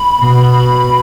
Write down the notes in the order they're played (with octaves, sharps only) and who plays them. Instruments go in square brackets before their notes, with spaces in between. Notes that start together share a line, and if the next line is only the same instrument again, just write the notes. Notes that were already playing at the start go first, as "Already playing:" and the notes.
Already playing: [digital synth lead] B5
[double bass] B2